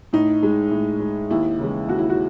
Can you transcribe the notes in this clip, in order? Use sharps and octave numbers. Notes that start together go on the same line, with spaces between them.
A2 D#4
G#3
A2
G#3
D#2 E4
C#3 E3 G#3
D#2 F#4
E4
F#4